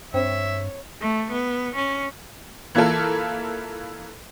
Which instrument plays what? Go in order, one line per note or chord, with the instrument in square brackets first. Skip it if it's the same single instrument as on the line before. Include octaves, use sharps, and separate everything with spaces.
[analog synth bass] G2 [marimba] C4 C5 G5 [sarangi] C#5 [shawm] E5
[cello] A3
B3
C#4
[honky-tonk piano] E3 A#3 E4 F4 A4 A#4